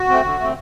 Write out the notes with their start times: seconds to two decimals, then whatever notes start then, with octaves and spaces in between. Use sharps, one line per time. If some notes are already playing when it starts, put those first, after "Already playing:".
Already playing: F#4
0.09 A3 C4
0.24 D3
0.40 A3 C4